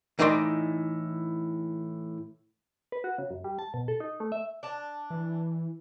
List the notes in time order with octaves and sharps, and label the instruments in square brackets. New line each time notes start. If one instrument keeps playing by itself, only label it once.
[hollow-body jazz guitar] A2 E3 D#4 D5 F#5 C6
[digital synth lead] B4
F#4
C#3
F#2
G3
A5
B2
A4
D#4
A3
E5
[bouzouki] D4 A5
[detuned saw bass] E3